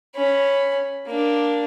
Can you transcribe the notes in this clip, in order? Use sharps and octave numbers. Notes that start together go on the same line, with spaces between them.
C#4 B5
A#3 D4